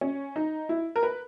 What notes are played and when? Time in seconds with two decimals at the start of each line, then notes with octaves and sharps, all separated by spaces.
0.01 C#4
0.36 D#4
0.69 E4
0.96 A#4
1.03 B4